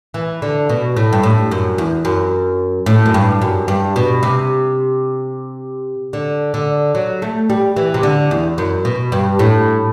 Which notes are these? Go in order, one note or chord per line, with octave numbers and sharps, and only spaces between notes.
E3
D3
B2
A2
G2
A2
F#2
E2
F#2
A2
F#2
G2
F#2
G2
B2
C3
D3
D3
F#3
A3
G3
E3
C3
D3
E2
F#2
B2
G2
A2